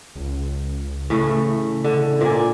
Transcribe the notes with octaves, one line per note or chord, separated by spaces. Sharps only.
C#2
A2 C#3 E3 A3
D3
A#2 A#4 D5 G#5